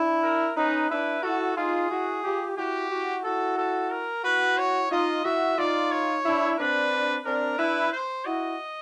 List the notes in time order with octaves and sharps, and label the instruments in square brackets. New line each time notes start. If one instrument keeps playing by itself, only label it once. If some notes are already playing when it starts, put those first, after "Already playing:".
Already playing: [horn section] D4 E4
[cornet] A#4
[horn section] C#4 D#4 [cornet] B4
[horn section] D4 E4 [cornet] B4
[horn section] E4 F#4 [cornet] A4
[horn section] D#4 F4 [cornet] G#4
[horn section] E4 F#4
F4 G4
[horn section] E4 F#4 [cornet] G4
[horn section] E4 F#4
[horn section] E4 F#4 [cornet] A4
[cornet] A4
A#4
[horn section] E4 F#4 [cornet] B4
[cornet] C#5
[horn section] D#4 F4 [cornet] D#5
[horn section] E4 F#4 [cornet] E5
[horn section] D#4 F4 [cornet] D5
[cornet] C#5
[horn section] D4 E4
[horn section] C4 D4 [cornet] B4
[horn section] C4 D4 [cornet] A#4
[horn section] D4 E4 [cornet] B4
[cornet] C5
[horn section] E4 F#4 [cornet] D#5